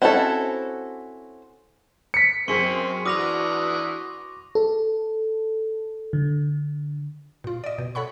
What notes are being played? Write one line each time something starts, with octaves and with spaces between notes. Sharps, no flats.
C4 C#4 E4 F#4 A4
B6 C#7
F#2 A#3 C4 G#4 C6 C#6 C7 D#7
E3 D4 F#4 D6 D#6 F6 A#6 F7
A4
D3
A#2 F4
D5 D#5
B2
A4 C#5 F#5 B5 C#6